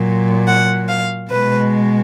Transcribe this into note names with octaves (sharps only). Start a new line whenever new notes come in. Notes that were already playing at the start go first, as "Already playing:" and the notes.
Already playing: A#2 F#3
F#5
F5
B2 G#3 B4